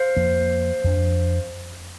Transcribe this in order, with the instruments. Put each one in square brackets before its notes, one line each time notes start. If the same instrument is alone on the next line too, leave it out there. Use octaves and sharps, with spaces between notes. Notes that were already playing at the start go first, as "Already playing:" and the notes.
Already playing: [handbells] C5 F5
[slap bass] F2 F3 A#3
F2 F3 D4